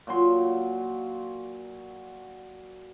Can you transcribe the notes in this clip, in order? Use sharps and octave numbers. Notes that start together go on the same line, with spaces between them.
A#2 F#3 C6